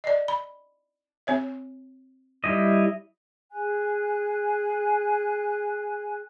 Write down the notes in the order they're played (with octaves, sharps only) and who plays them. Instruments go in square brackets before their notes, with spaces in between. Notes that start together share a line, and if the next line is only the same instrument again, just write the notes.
[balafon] D5 D#5
B5
C4 C#5 E5
[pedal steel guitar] G3 E4 D#5
[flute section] G#4 G#5 F#6